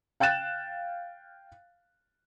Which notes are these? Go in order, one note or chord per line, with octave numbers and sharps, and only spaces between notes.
F5 G5 F#6 A6 E7